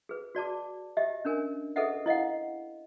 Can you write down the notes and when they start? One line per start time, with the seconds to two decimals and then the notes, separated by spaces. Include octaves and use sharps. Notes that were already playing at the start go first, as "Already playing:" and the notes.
0.09 G#4 B4
0.35 F#4 D5 A5 D6
0.97 G4 D#5 E5
1.25 C#4 D4 A#4 G#5
1.76 G#4 A4 B4 D#5 E5 F#5
2.06 E4 D#5 F5 F#5